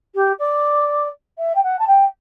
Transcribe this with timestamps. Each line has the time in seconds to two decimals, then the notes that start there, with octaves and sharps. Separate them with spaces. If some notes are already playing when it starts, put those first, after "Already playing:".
0.15 G4
0.39 D5
1.38 E5
1.55 G5
1.63 F#5
1.79 A5
1.87 G5